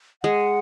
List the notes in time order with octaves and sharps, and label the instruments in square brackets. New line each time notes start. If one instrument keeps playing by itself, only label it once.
[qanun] G#3 [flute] F#5